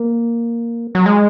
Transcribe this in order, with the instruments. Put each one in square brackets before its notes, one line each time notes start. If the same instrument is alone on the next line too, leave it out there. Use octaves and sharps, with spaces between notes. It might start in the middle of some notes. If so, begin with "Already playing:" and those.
Already playing: [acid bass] A#3
F#3
G#3